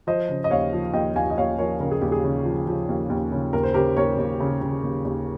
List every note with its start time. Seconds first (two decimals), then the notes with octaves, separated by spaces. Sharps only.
0.07 F3 C5 D#5
0.29 C#3
0.44 D#5
0.50 D#2 C#5 F5
0.73 F3
0.93 D#2 D#5 G5
1.15 D#2 F5 G#5
1.30 D#5
1.37 D#2 C#5 F5
1.58 F3 A#4 C#5
1.80 C#3 A#4
1.91 G#4
2.01 D#2 G4
2.12 G#4
2.24 C#3
2.45 F3
2.67 F3
2.89 D#2
3.10 D#2
3.32 C#3
3.53 D#2 A#4
3.63 C5
3.74 C#3 G4 A#4
3.96 D#2 A#4 C#5
4.18 D#2
4.40 C#3
4.61 C#3
4.83 D#2
5.05 D#2